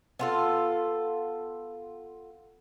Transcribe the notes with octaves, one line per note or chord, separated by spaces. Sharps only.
B3 F4 A4